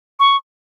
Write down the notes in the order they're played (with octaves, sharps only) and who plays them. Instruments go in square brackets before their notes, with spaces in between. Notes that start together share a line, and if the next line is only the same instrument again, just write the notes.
[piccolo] C#6